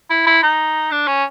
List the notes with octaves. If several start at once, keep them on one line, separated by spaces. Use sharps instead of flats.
E4
E4
D#4
D4
C#4